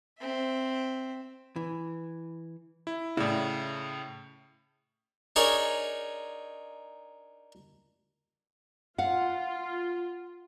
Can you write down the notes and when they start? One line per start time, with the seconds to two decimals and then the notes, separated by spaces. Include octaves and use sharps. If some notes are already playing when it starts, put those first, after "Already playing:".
0.19 C4 E5
1.56 E3
2.87 E4
3.17 A2 C#3 E4 D5
5.36 D4 D#4 G#4 A#4 C#5
8.98 F4 F5 F#5